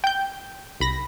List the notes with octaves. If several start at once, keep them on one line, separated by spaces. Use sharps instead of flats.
G5 G6
C2 B5 A#6